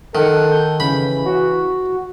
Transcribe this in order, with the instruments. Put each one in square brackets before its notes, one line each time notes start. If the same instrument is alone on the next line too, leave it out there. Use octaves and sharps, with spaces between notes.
[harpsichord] D#3 [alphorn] A4 [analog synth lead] F#5
[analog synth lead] G6
[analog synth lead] C#3 [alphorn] E3 [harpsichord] B5
[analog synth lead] F#4